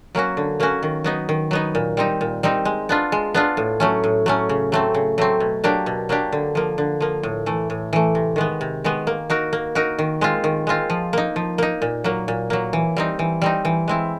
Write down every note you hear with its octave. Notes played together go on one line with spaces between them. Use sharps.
F#3 A#3 C#4 F#4
D3
F#3 A#3 C#4 F#4
D#3
F#3 B3 D#4
D#3
F#3 B3 D#4
A#2
G3 C4 D#4
A#2
G3 C4 D#4
G#3
B3 D4 F4
G#3
B3 D4 F4
A2
F#3 A3 C#4
A2
F#3 A3 C#4
C#3
F#3 A3 C4
C#3
F#3 A3 C4
B2
F#3 A#3 D4 G4
B2
F#3 A#3 D4 G4
D3
F3 A#3
D3
F3 A#3
A2
E3 A3
A2
E3 A3
C3
D#3 G#3 B3
C3
D#3 G#3 B3
A#3
D#4 F#4 A#4
A#3
D#4 F#4 A#4
D#3
G#3 C4 F4
D#3
G#3 C4 F4
F3
A#3 D#4
F3
A#3 D#4
A#2
F#3 A#3
A#2
F#3 A#3
E3
G3 C4 D#4
E3
G3 C4 D#4
E3
G#3 C4 E4